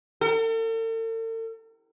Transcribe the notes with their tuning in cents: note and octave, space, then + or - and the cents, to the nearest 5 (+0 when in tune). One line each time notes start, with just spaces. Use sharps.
A4 +45